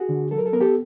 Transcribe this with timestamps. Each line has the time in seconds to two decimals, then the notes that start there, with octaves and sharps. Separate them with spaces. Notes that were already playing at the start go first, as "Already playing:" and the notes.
Already playing: F#4 G#4
0.09 D3
0.31 F#3 A4
0.38 A#4
0.46 A4
0.53 B3 A#4
0.61 G4 A4